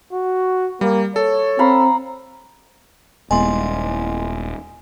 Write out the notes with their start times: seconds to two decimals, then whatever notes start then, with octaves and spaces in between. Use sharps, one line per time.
0.13 F#4
0.81 G3 A#3
1.16 A4 C#5
1.59 C4 F5 A#5 B5
3.31 D#1 G#3 B3 E4 D#5 G#5 C6